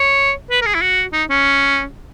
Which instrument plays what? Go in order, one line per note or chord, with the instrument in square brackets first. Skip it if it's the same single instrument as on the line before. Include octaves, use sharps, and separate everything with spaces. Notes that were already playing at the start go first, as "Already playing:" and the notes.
Already playing: [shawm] C#5
B4
A#4
G#4
E4
F#4
D#4
C#4